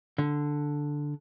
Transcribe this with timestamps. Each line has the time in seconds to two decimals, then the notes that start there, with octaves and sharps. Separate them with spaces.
0.18 D3